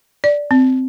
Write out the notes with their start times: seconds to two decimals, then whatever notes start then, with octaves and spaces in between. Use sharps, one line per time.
0.24 D5
0.51 C4